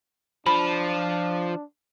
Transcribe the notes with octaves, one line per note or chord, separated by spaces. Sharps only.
F3 D4 B5